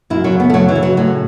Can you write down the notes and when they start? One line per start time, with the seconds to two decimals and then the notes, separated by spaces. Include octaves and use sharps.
0.10 F#2 E4
0.24 F#3
0.32 C#3
0.40 B3
0.50 A3
0.53 F#2 F#3
0.69 E3
0.75 C#3
0.83 F#3
0.97 A2 F#3